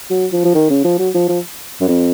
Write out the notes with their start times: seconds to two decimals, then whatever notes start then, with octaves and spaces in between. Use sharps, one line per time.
0.10 F#3
0.33 F3
0.45 F3
0.55 D#3
0.70 C#3
0.84 F3
0.99 F#3
1.14 F3
1.29 F3
1.81 F#2
1.88 F2